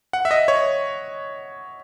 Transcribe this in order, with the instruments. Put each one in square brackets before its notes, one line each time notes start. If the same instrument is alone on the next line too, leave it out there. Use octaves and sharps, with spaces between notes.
[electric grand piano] F#5
E5
D#5
C#5